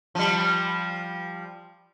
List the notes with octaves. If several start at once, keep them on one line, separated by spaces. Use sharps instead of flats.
F3 G3